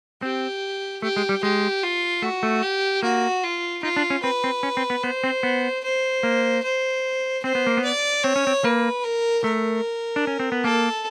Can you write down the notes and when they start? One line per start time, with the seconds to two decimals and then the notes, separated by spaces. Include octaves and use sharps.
0.22 C4 G4
1.02 A3 G4
1.16 G#3
1.29 G3
1.43 G#3 G4
1.83 F4
2.22 A3 F#4
2.43 A3
2.63 G4
3.03 A#3 F#4
3.44 F4
3.83 D#4 F4
3.96 D4
4.10 C#4
4.23 C4 B4
4.44 C4
4.63 C#4
4.77 C4
4.90 B3
5.04 B3 C5
5.24 C4
5.43 B3
5.84 C5
6.23 A#3
6.64 C5
7.43 C4 C5
7.55 B3
7.67 A#3
7.77 B3
7.84 D5
8.23 C4 C#5
8.36 C#4
8.47 C4
8.64 A#3 B4
9.04 A#4
9.44 A3 A#4
10.16 D4
10.27 C#4
10.40 C4
10.52 B3
10.64 A#3 A4